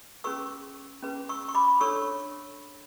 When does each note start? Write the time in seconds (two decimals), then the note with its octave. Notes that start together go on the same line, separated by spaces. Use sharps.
0.24 C#4 G#4 B4 C#6 E6
1.03 C#4 G#4 B4
1.29 C#6 E6
1.48 C#6
1.55 B5 D6
1.81 D4 A4 C#5 C#6 E6